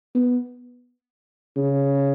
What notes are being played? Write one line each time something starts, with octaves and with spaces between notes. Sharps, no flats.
B3
C#3